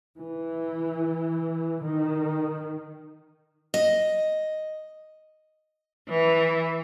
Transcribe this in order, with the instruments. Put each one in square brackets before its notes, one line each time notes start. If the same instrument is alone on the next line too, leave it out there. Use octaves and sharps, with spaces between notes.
[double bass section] E3
D#3
[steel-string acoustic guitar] D#5
[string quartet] E3